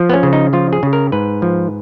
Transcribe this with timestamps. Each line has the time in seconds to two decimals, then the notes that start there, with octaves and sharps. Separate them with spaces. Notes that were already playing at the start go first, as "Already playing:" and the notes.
Already playing: F3
0.10 B3
0.13 C#4
0.23 C#3
0.33 D#4
0.53 F3 F4
0.73 G#4
0.83 C#3
0.93 A#4
1.12 G#2 B4
1.42 F3